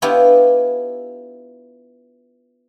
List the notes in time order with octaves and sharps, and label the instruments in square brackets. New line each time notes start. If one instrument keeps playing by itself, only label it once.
[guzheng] B3 D4 E4 F4 G4 C#5